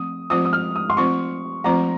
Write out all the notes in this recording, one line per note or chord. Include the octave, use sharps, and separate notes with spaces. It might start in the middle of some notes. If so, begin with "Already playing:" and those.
Already playing: F3 A3 C4 D#6
F3 A3 C4 F4 C5 D#6
D#6
F6
D#6
C6
F3 A3 C4 F4 C5 C#6
F3 A3 C4 F4 C5 A#5